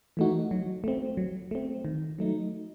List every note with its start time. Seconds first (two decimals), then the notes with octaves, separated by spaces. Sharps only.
0.17 E3 A3 D#4 F#4
0.51 F#3
0.84 A3 C4
1.17 F#3
1.51 A3 C4
1.85 D#3
2.19 F#3 A3 D#4